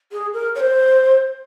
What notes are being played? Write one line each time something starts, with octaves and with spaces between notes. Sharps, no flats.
G#4
A#4
C#5
C5